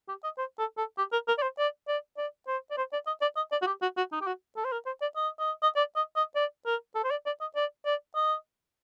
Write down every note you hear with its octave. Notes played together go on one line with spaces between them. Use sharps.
G4
D#5
C5
A4
A4
G4
A#4
A#4
D5
C5
D5
D5
D5
C5
D5
C5
D5
D#5
D5
D#5
D5
F#4
G4
F#4
F#4
D#4
G4
F#4
A4
C5
A#4
C5
D5
D#5
D#5
D#5
D5
D#5
D#5
D5
A#4
A4
C5
D5
D5
D#5
D5
D5
D#5